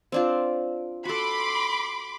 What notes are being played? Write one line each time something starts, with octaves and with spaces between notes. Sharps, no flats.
C4 D4 F4
F#4 A4 B5 C6 D6